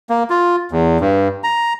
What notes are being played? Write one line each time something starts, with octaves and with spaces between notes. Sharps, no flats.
A#3
F4
E2
G2
A#5